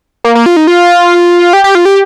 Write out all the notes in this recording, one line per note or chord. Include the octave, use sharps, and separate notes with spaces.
A#3
A#3
F4
D#4
F4
G4
G4
F4
G4